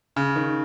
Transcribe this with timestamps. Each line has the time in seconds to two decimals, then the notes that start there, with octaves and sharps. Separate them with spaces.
0.16 C#3
0.36 D#3